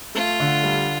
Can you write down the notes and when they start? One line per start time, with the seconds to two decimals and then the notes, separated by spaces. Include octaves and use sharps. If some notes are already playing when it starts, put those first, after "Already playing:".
0.15 A3 F4
0.40 D3
0.63 G3